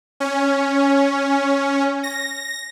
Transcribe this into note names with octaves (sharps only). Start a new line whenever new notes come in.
C#4
A#6